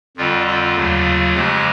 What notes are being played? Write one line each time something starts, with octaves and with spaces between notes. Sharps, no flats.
F2 D3 G3 F4
F4
D#2 C#3 F#3 A3
F2 C#3 F3 G#3 G4